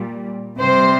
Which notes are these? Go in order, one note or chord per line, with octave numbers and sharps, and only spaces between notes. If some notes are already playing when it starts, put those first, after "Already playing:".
Already playing: A#2 G3
C3 G3 C5